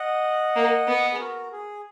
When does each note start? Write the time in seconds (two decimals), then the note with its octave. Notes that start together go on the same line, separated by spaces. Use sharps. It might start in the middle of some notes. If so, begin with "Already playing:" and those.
Already playing: D#5 F#5
0.56 A#3
0.87 B3
1.12 G#4
1.20 F#4 A#4
1.52 G#4